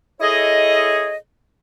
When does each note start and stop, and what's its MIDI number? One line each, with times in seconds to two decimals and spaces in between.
0.21 1.16 64
0.21 1.16 68
0.21 1.16 69
0.21 1.16 73
0.21 1.16 75